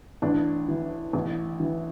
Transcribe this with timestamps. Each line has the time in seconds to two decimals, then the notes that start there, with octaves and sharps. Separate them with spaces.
0.22 A1 D4
0.68 E3
1.13 A1
1.60 E3